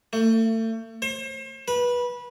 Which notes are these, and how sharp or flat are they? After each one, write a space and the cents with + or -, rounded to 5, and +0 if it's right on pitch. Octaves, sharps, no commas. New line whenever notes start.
A3 +35
C5 +40
B4 -20